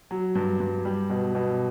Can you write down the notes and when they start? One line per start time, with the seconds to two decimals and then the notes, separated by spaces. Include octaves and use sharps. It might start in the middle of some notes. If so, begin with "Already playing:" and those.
0.11 F#3
0.35 G2
0.60 G2
0.85 G3
1.10 B2
1.35 B2